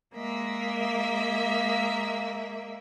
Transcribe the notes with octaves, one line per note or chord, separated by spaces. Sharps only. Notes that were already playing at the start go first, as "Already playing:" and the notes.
G#3 A#3 E5